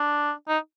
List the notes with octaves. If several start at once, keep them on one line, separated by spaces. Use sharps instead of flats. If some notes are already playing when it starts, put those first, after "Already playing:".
Already playing: D4
D#4